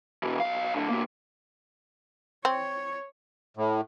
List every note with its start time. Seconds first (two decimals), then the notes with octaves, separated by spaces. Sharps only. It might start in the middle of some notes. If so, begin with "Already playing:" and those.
0.23 B2 E3
0.40 B1 F5
0.74 A2 D3
0.88 C3 A#3
2.45 C4 C#5
3.57 A2